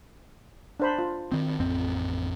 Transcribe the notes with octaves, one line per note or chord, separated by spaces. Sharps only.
D4 C5 B5
F4
D#3 C4
A1 F2 C4